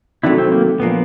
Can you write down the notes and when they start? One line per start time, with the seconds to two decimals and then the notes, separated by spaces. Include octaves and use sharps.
0.23 C3 D#3 F#3 A3 D4 E4
0.38 C4
0.52 A#3
0.80 A#2 F3 A#3 B3 D4